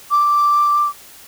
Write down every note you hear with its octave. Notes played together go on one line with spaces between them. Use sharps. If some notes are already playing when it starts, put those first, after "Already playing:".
D6